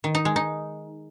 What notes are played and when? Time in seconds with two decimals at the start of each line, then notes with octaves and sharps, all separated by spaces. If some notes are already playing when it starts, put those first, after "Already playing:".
0.04 D#3
0.15 D#4
0.25 G#3
0.36 D#4